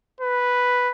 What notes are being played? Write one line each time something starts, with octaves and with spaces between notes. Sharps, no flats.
B4